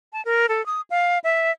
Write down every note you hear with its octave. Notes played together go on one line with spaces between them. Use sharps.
A5
A#4
A4
D#6
F5
E5